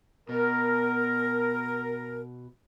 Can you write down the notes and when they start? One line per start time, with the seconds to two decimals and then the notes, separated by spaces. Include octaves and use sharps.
0.29 B2 A#4